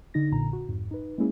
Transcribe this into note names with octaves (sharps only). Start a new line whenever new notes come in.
D3 D#4 A#6
A#1 A#2 D3 A#5
F#4
F2 G#2
D#4 B4
G#3 A#3 C#4 E4 G#4